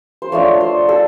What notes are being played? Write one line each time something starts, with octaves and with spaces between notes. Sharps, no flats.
C5
F3 A3 D4 C#5
C5
A4